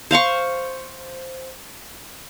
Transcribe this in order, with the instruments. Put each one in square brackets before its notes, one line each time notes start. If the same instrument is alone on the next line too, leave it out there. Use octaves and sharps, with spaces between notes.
[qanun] C5 F5 C6 C#6